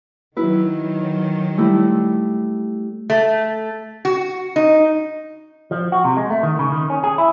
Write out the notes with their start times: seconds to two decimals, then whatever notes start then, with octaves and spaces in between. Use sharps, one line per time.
0.37 D#3 F#3 E4 B4
1.57 G3 A3 E4
3.10 A3
4.05 F#4
4.56 D#4
5.71 F3
5.92 F#4
6.05 C3
6.17 G#3
6.30 A3
6.43 D#3
6.59 C#3
6.72 D#3
6.90 C#4
7.04 G#4
7.18 E4